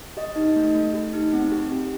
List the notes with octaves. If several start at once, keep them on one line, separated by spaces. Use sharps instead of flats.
G4 D#5
D#4
A3
A3
G4
D#4
C4
G4
G4